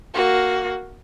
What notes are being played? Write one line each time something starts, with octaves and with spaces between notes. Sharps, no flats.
A#3 F#4